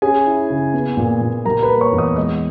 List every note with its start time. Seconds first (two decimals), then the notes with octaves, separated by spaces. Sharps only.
0.02 C#4 G#4 G#5
0.27 E4
0.50 C#3
0.74 B3
0.97 A#2
1.21 A#2
1.45 G3 A#4 A#5
1.63 B4 B5
1.69 A#3
1.81 C#5 C#6
1.92 E2
1.98 D#5 D#6
2.16 G#3 D#5 D#6